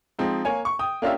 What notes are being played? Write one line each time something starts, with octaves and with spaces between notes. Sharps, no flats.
F3 G#3 C4 D#4
A#3 C#5 G#5
C#6
G5 D#6
A#3 C#4 D4 F4 G4 E5